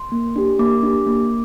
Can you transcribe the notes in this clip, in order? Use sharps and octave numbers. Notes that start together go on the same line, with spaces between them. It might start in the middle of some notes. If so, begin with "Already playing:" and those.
Already playing: C6
A#3
D4 G4
A#3 D6
D4 G4
A#3